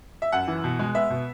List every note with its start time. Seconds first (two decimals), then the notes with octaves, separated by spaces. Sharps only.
0.22 E5
0.32 F#2 F#5
0.48 E3
0.64 B2
0.79 G#3
0.94 B3 E5
1.10 B2